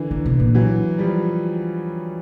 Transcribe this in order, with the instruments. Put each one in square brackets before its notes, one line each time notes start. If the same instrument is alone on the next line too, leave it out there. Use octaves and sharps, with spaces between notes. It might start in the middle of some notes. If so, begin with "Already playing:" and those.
Already playing: [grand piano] D3 E3
[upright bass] D#3
B2
A#2
[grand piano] E3 F#3
F3 G3